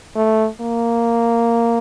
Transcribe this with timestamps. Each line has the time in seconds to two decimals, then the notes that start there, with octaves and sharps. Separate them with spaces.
0.16 A3
0.61 A#3